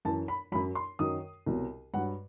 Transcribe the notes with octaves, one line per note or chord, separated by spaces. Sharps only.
F#2 E3 A5
B5
F#2 F#3 B5
C6
F#2 D#3 F#3 D#6
C2 B2 F#3
G2 F#3 F#5